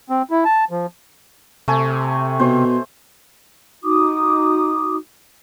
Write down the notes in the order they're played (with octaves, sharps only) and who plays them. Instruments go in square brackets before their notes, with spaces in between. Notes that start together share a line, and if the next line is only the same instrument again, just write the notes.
[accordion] C4
E4
A5
F3
[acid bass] C3 [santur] A3 G#5
[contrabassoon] B2 [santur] C5
[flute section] D#4 F#4 D6 D#6